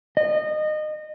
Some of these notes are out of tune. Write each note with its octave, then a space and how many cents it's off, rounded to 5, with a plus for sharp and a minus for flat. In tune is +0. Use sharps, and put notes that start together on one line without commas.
D#5 -25